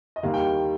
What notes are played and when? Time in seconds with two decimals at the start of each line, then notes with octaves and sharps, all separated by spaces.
0.16 D#5
0.23 D#2 D#3 G3 A#3 F5
0.34 G5